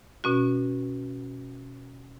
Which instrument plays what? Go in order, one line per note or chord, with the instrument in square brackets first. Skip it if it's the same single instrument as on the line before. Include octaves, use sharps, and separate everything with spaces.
[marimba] B2 C#4 F#4